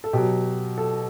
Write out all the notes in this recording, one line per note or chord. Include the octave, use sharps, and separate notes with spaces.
A4
B2 F#3 G4
A4